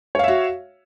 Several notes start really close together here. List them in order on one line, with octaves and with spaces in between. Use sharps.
C#5 F5 E5 F#4